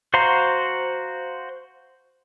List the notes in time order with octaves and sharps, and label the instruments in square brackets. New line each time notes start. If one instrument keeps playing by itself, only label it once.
[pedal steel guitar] F#4 C5 F5 A#5 C6